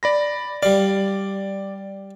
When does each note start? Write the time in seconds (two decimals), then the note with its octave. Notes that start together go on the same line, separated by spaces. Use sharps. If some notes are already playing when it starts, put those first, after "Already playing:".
0.03 D5 B5 A#6
0.63 G3 D5 F5